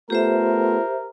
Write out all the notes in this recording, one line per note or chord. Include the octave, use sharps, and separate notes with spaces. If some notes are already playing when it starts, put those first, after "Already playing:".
A3 B3 F4 G4 A4 A#4 C5 E5